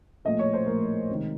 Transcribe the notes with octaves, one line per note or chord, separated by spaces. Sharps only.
A#1 A2 F3 A3 D#5
C#5
C5
A#1 A2 F3 A3 A#4
C#2 C3 D#3